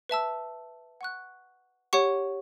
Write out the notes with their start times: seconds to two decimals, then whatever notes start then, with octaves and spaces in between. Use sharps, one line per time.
0.09 B4 E5 A5 E6
1.01 F#5 C#6 F#6
1.93 G4 C#5 F#5 C#6